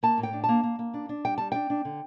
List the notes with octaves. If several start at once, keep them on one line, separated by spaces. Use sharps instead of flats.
A#3 A5
A2
G5
D4
A5
A#3
A#3
A#3
D4
D4
G3 G5
G3 A5
D4 G5
D4
D3